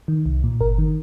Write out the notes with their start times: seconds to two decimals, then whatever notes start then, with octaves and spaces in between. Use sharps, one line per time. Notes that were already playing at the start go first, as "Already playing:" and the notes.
0.08 D#3
0.26 C2
0.44 A#2
0.61 G1 A#4
0.78 D#3